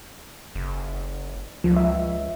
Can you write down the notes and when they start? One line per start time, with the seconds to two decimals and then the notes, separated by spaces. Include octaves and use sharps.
0.55 F#1
1.64 C#2 F3
1.77 E5